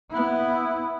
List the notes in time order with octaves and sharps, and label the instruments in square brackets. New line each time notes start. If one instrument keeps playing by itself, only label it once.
[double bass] B3 E4